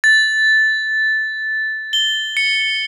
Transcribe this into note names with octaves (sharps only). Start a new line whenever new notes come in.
A6
G7
C#7